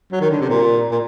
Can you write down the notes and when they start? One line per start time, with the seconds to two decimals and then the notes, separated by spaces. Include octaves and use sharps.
0.12 F#3
0.21 D#3
0.30 D3
0.41 C3
0.50 A#2
0.91 A#2